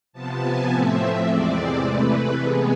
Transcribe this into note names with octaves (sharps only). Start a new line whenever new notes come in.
C3 F3 B3 A5
G#5
A2 F3 A3 C4 E5
E2 C3 G#3 C4 D5
C3 E3 A3 B4
C3 G#3 B3 G#4